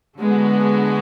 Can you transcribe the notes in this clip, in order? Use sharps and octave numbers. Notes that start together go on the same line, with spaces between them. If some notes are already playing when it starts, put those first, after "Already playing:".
D3 G#3 B3 F#4